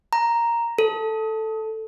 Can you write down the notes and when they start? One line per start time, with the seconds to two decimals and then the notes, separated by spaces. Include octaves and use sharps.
0.13 A#5
0.78 A4